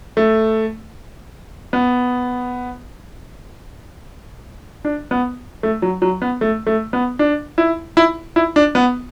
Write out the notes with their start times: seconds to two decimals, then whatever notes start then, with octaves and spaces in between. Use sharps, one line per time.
0.17 A3
1.73 B3
4.85 D4
5.11 B3
5.63 A3
5.82 F#3
6.02 F#3
6.22 B3
6.41 A3
6.67 A3
6.93 B3
7.19 D4
7.58 E4
7.97 E4
8.36 E4
8.56 D4
8.75 B3